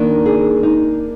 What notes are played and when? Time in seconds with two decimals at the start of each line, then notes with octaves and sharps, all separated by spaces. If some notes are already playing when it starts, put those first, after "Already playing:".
Already playing: D#3 A#3 D4
0.26 G#4
0.63 D#4